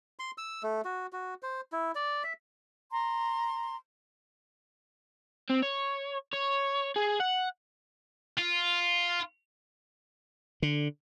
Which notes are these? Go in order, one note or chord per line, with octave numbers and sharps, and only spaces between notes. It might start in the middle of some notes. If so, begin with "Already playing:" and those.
C6
E6
A3
F#4
F#4
C5
E4
D5
E5
A#5 C6
C4
C#5
C#5
G#4
F#5
F4
D3